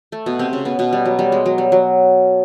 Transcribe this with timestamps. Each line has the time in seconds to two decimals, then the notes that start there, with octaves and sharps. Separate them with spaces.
0.12 A3
0.26 B2 B3
0.39 C3 C4
0.53 C#3 C#4
0.65 B2 B3
0.79 B2 B3
0.93 G3
1.05 F#3
1.19 G3
1.32 G#3
1.46 F#3
1.58 G3
1.72 F#3